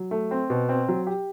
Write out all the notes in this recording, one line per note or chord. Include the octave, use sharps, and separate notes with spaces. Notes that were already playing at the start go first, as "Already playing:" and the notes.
Already playing: F#3
A3
C4
B2
C4
F#3
G4